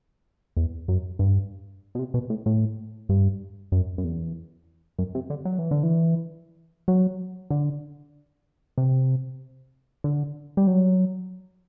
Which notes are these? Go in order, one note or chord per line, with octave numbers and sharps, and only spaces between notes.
E2
F#2
G2
B2
C3
B2
A2
A2
G2
F#2
F#2
E2
F#2
C3
D3
F#3
E3
D3
E3
F#3
D3
C3
D3
G3
F#3